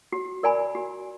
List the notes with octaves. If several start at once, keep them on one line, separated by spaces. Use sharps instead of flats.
F#4
A#4 D5 G#5 B5
F#4